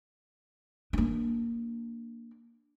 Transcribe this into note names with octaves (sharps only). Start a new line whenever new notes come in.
A#3 D4